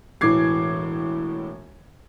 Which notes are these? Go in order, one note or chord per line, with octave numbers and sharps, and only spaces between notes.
E1 A2 E3 D6 G#6 C7